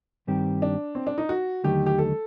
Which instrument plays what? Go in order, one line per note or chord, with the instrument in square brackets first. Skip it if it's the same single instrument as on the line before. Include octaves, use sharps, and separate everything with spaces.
[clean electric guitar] G2 D#3 G3 C4 G4
[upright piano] D4
C4
D4
D#4
F#4
[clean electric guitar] D#2 D3 F#3 A3 D#4 [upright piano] G4
[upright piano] G4
A4